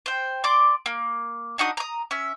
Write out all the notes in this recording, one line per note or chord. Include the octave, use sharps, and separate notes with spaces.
C5 G5
D5 C6 D6
A#3
D4 D#4 F#4 D#6
A#5 D#6
C#4 E5